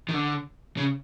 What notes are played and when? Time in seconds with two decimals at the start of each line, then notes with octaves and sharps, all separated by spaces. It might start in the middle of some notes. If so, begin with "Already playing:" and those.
0.09 D#3
0.14 D3
0.77 C#3